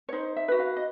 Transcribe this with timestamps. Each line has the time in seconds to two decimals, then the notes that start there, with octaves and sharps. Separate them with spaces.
0.09 C#5
0.13 D#4 C5
0.36 E5
0.48 F#4 B4
0.60 F5
0.76 D#5